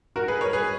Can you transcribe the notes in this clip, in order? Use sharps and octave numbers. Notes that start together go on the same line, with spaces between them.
F#4 A#4
G#4 B4
A#4 C#5
G#4 B4